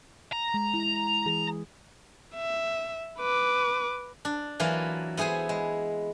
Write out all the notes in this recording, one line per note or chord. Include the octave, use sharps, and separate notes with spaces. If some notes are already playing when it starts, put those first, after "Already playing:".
A#5
G#3
E4
E3 G#4
E5
B4 D6
D4
E3 F#3 A#3 F4 B4
B3 E4 G#4 C5 G#5
G#3